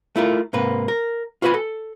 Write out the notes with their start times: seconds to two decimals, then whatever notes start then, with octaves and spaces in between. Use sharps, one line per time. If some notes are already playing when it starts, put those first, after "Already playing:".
0.16 A3 E4 F4 A#4
0.53 G#2 C3 A#3 B4
0.88 A#4
1.42 F4 F#4 B4 D5 G#5 B5
1.54 A4